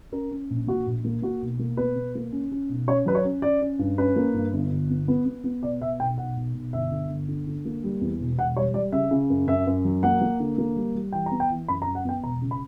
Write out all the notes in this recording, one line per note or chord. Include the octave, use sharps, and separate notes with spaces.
C#4 A#4
C#4
A#1
A#2 F#4
A#1
A#3
A#3 F#4
B1
A#3
B2 B4
B2
A#3
C#4
C#4
B1
C#4 C#5
F#3 B4
C#5
C#4
C#4 D5
C#4
G2
C#4 B4
A#3
G2
G1
G1
B3
B3
B3
B3
B2 D5
B2 E5
B1 G5
B1 F#5
B1
B1
G1 E5
D3
G1
D3
D3
A#3
G3
E2
E1
E1 F#5
G3 C#5
G3 D5
C#3 E5
C#3
F#2
F#2 E5
F#2
F#3
A#3 F#5
A#3
D3
A#3
G3
G3
E3 G5
A#5
B3
G5
E3
F#2 B5
A#5
F#2
F#5
B3 G5
E1 A#5
C#3
B5